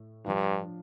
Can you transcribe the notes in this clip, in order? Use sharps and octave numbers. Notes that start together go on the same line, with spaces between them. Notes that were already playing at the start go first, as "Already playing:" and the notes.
Already playing: A2 A3
G2 F3 D4 F4